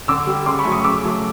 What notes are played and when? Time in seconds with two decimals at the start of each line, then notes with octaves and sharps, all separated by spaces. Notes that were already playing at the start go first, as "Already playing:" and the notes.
0.08 D3 D6 E6
0.27 G3
0.46 C#3 C6 D6
0.59 B5 C#6
0.65 F#3 A3
0.72 C#6 D#6
0.84 C#3 D6 E6
1.03 F#3 A3